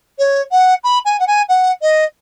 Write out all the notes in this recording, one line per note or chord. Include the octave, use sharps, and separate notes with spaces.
C#5
F#5
B5
G#5
F#5
G#5
F#5
D#5